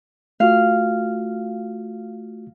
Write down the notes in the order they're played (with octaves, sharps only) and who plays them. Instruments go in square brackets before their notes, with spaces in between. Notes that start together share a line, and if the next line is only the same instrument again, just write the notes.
[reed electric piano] A3 F4 F#4 [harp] F5